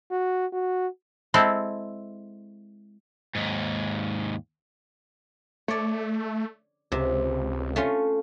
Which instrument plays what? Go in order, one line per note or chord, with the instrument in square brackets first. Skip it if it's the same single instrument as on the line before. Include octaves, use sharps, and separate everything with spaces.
[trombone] F#4
F#4
[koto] G#3 C4 E4 A4
[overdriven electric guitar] D#2 G#2
[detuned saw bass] A3 [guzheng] C#5 D5
[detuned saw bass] C#2 [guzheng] C3
[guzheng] A3 C#4 F4